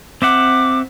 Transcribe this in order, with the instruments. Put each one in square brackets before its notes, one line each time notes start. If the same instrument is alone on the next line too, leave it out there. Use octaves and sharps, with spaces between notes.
[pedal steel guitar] C4 E5 F#5 [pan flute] D6